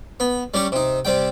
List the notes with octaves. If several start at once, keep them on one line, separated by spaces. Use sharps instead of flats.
B3
G3 C#4 G4 C#6
C3 D#4
C3 G3 G5